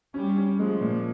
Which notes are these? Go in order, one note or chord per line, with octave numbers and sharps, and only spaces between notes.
G3 C#4
C#4
F3 G#3
A#2